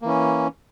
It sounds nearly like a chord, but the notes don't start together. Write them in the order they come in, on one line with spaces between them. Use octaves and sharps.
A#3 E3 C#4